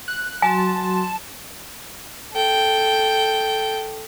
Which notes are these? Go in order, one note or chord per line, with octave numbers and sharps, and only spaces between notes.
F#6
F#3 F#4 G#5 A5 C6
A4 G5